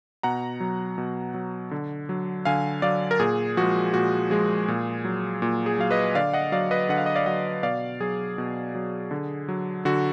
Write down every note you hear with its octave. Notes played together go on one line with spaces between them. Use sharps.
B2 F#5 A#5
F#3
B2
F#3
D3
F#3
D3 F5 G#5
F#3 D5 F5
A#4
A#2 G#4
F3 G#3 F#4
A#2 F#4
F3 G#3 G#4
A#2
F#3
A#2
G#4
F#3 F5
B4 D#5
D3 D5 F5
D#5 F#5
F#3 D5 F5
B4 D#5
D3 F#5
F5
D#5
D5 F5
F#3 D#5 F#5
B2 D5 F5
F#3 G#4
B2
F#3
D3
F#3
D3 F#4